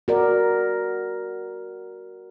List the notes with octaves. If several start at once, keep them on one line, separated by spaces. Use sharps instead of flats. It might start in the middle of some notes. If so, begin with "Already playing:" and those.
F#4 A#4 D5